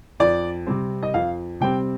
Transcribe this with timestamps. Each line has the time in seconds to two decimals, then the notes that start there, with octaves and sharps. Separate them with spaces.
0.20 F2 D5
0.67 C3 G3 C4
1.03 D#5
1.14 F2 F5
1.60 C3 G3 C4 G5